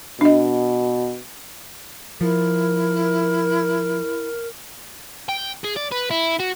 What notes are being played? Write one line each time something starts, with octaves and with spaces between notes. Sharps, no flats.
B2 D4 D#5
F3 E4 A#4
G5
G#4
D5
B4
E4
F#4